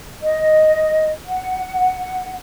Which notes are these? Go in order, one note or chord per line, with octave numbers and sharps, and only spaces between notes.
D#5
F#5